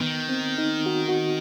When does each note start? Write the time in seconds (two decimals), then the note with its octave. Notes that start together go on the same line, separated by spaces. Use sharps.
0.01 D#3 B3
0.29 C4
0.58 D#4
0.86 F#4
1.09 F#4